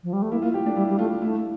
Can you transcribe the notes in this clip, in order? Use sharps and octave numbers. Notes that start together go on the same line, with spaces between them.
F3
G3
A3
A#3 E4
A#3 F4
G4
A3 D4
G3 E4
G3
A3 F4
A3 E4